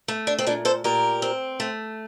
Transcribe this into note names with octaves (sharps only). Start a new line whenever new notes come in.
A3
D4
C4
A#2 D4
A4 C5
A#2 G4 A#4
C4
A3